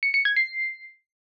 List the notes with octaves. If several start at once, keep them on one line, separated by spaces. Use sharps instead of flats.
C#7
C#7
G#6
C7